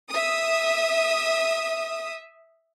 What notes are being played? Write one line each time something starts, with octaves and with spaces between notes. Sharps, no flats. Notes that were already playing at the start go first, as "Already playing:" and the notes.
E5 D#6